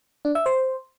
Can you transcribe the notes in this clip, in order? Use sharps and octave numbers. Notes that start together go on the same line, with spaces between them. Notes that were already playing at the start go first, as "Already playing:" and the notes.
D4
E5
C5